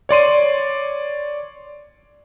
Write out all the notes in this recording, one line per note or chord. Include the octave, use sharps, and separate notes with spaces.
C#5 D5 C6 D#7